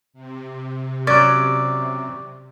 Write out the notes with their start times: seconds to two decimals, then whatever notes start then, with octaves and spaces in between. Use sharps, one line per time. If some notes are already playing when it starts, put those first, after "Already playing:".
0.13 C3
1.07 F#3 C#4 D5